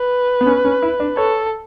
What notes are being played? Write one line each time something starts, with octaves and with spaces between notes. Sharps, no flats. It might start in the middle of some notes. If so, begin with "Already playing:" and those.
Already playing: B4
B3
C#4
C#4
E4
D4
A4 C#5